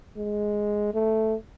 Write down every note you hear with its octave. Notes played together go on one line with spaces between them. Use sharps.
G#3
A3